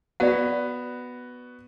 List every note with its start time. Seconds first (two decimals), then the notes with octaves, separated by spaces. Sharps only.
0.20 B3 F#4 D5 F#5